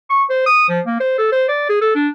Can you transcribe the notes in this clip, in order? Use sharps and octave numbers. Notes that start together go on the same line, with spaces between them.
C#6
C5
D#6
F3
A#3
C5
A4
C5
D5
G#4
A4
D4